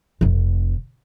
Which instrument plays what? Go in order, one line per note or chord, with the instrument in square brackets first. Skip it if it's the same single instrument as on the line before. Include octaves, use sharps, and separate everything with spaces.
[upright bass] F1 C3